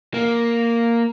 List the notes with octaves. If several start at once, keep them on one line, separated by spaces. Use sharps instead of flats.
A#3